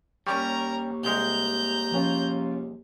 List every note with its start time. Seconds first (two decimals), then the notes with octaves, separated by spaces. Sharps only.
0.27 D#2 G3 C#4 A#4 A#5 C#6
1.03 C2 G#3 A#5 G6
1.92 F3 C#4 F4